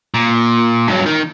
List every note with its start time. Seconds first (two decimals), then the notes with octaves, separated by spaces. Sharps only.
0.14 A#2
0.88 G2 F#3
1.06 D#3